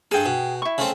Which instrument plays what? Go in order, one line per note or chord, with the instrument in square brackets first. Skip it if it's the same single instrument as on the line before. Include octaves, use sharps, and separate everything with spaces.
[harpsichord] G2 A4 [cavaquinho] G#4 G5
[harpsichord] B2
[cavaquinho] E4 C#6
[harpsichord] C#3 A3 C4